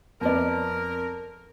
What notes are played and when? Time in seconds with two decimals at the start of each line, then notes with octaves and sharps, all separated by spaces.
0.21 F2 B3 A#4 D5